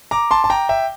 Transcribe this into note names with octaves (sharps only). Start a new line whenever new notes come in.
A#5 D6
A5 C6
A5
G5 A#5
E5 G5